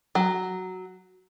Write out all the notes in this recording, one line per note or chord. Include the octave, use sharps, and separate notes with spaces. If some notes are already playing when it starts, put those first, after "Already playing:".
F#3